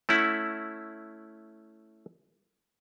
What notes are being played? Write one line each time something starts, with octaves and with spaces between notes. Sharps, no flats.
A3 C#4 E4 F#5